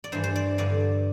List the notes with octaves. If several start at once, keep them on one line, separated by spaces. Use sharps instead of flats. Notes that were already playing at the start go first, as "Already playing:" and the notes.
D5
G2 E3 C5
C5
D5
G2 D3 D5